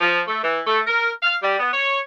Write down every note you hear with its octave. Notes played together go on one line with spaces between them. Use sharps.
F3
A3
E3
A3
A#4
F5
G3
B3
C#5